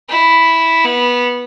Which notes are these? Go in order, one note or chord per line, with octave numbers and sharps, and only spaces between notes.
E4
B3